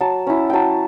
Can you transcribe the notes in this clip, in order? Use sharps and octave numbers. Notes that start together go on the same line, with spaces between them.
F#3 A5
C#4 E4
F#3 G5 A5